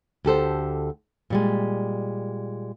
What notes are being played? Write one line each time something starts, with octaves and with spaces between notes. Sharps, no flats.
D2 G4 A4 C5
A#2 G3 G#3